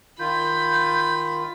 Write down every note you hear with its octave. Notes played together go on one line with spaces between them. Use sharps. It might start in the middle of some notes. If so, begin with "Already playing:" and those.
D#3 F4 B5 G6